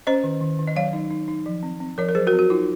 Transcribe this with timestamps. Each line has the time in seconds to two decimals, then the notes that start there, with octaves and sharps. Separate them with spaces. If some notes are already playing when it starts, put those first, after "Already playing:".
0.07 C#4 C5 D#5
0.24 D#3
0.41 D#3
0.59 D#3
0.67 D#5
0.76 F#3 C#5 F5
0.93 D#4
1.11 D#4
1.28 D#4
1.46 F3
1.63 C4
1.80 C4
1.98 F3 A#4 C#5
2.09 A#4
2.15 F#3 G#4 C5
2.27 F#4 A#4
2.33 C4
2.39 F#4
2.50 D#4 F4